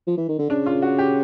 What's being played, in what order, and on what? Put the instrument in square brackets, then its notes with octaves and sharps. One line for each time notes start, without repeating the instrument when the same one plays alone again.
[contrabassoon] F3
E3
D#3
D3
[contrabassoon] C#3 [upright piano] D4
[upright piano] F4
F#4
G4